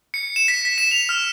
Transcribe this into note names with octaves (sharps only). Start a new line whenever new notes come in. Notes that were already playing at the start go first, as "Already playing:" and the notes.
C#7
E7
B6
B6
E7
F7
F6